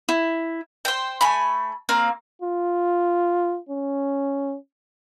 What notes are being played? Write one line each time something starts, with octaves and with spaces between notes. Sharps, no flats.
E4
C5 G5
A3 G#5 B5
A#3 C4 F5
F4
C#4